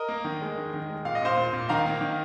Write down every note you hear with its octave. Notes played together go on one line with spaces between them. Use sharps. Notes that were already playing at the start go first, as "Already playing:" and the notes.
Already playing: A#4 D#5
A#3
D#3
G#3
D#3
D#3
G#3
A#2 F5
D#5
A#2 C5 F5
A#2
A#2
D#3 F5 A#5
A#3
D#3